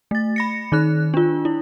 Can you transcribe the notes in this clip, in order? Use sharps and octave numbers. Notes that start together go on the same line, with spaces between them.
A3 A6
B5 A#6 C#7
D#3 D#4 F#6
D4 F4
E4